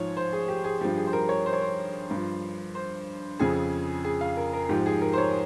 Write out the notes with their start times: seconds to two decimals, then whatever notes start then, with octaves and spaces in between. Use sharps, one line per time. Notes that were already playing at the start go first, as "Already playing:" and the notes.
Already playing: G#2 F3 C#5
0.17 C5
0.33 G#4
0.48 G4
0.64 G#4
0.81 G2 F3 G4
0.97 G#4
1.07 C5
1.13 A#4
1.29 C#5
1.46 C5
1.53 C#5
1.61 C5
2.11 G2 F3
2.75 C5
3.40 F2 C#3 F3 G#4
4.04 G#4
4.21 F5
4.37 A#4
4.53 A#4
4.69 G#2 F3 G4
4.86 G#4
5.02 A#4
5.13 C5
5.18 C#5